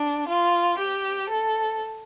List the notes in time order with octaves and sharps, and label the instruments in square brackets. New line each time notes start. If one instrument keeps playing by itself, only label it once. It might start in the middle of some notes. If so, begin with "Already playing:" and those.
Already playing: [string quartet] D4
F4
G4
A4